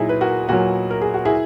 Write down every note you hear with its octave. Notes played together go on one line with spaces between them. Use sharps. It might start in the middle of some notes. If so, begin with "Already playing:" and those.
Already playing: A#2 F#3 D#4 E4 G#4
B4
F#4 A#4
A#2 F#3 F#4 A#4
A#4
G#4
F#4
E4 G#4